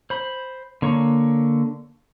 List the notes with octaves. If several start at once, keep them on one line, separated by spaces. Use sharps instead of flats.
C5 B5
D3 A#3 C#5